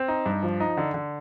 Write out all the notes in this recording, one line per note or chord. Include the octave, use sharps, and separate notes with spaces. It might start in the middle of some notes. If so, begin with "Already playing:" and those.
Already playing: C4
D#4
G2
F3
D#4
D3
D3